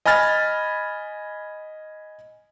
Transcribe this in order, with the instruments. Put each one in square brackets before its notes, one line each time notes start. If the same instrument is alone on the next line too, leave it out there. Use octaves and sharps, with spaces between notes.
[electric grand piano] D#5 G#5 B5 F6 A6